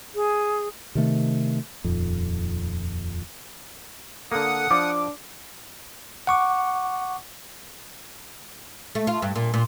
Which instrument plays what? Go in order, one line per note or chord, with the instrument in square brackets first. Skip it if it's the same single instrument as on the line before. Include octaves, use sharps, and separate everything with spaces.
[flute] G#4
[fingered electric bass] C3 D#3 A3
D#1 F2
[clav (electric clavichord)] D3 A#3 [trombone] A4 [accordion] F#5 D#6
[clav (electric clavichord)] F3 [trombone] D4 [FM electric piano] D6
[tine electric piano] F#5 C#6 D6
[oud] A3
F4
G2
A#2
A#2